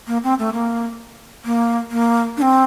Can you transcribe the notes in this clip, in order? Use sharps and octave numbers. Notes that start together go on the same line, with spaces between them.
A#3
C4
A3
A#3
A#3
A#3
D4
C4